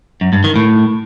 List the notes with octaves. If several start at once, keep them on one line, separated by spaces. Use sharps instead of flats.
F#2
G2
D#3
A2